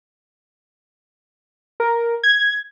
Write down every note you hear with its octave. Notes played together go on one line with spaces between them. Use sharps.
A#4
G#6